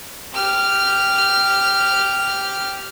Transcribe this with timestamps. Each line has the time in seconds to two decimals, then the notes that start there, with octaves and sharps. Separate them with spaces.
0.34 G4 F6